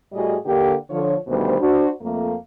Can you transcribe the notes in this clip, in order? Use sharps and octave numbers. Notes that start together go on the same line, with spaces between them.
A2 G3 F#4 G#4 D#5
D3 A#3 G4
D3 F3 C#5
D2 B2 D#3 G3 C5
D4 F#4 C5
F2 A3 A#3